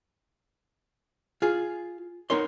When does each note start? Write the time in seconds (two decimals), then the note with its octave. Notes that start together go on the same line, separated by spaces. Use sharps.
1.42 F4 G#4
2.30 B3 D#4 A#4 C#5 C6